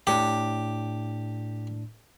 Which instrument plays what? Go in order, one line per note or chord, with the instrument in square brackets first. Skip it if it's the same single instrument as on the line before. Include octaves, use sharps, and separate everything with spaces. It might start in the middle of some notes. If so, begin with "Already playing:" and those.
[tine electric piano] A2 D4 [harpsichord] G4